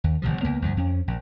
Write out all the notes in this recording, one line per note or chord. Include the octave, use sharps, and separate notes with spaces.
D#2
G1 D2 C3 F3
C#2 A2 A#3 B3
D2 G2 F3
F2 C#4
A#1